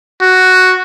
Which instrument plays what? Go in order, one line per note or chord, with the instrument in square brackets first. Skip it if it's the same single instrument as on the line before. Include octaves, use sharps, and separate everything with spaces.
[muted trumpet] F#4